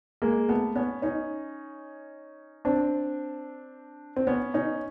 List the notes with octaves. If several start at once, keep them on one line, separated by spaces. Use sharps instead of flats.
G#3 A#3
A3 B3
B3 C#4
C#4 D#4
C4 D4
C4
B3 C#4
C#4 D#4